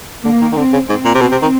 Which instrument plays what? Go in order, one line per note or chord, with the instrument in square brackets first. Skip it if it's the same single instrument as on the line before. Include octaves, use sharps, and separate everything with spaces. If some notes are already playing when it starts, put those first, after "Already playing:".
[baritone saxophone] D3 [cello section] A#3
[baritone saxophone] D#3
D#3
[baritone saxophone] D3 [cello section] C4
[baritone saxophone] C#3
[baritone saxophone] G#2 [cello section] C4
[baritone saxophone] A#2
C3
[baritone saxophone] B2 [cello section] C4
[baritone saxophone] C3
D#3